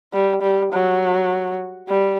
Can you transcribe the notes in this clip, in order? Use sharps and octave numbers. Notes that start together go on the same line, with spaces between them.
G3
G3
F#3
G3